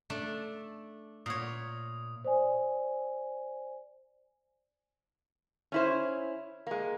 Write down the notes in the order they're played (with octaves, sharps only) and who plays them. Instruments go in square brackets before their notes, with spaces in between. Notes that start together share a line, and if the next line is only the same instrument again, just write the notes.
[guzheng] A3 D4
[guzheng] A#2 C#5 [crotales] D#6
[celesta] C5 D5 G#5
[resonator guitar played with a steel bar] C#4 E4 C5
G#3 A#3